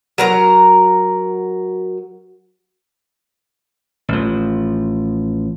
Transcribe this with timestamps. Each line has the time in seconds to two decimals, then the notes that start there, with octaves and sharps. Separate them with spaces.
0.18 F#3 A#4 A#5
4.08 A1 F3